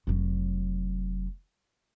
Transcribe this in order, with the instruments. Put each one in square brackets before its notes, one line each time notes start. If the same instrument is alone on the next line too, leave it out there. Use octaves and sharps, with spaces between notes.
[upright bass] F1 F#3